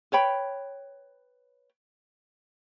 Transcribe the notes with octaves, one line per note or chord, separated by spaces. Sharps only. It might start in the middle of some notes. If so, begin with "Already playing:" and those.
B4 C#5 G5 B5